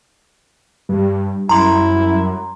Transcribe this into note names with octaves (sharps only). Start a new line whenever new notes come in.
G2 G3
F#2 E4 A#5 C6